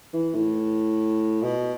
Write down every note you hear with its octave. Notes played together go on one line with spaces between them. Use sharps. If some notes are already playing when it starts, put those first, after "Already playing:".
E3
A2
B2